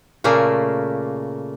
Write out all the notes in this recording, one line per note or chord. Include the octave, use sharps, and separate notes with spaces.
A#2 C#3 A3 A#3